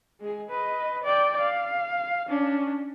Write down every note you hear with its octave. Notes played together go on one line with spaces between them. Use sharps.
G#3 G#4
B4 D#5
D5 G5
F5
C#4 D4